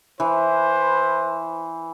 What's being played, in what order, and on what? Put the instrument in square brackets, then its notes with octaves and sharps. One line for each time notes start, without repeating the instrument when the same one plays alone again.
[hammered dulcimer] E3 [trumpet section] E4 B4 C5